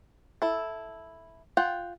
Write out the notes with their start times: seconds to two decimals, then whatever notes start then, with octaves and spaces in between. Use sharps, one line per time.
0.42 E4 A4
1.57 F4 F#5 G5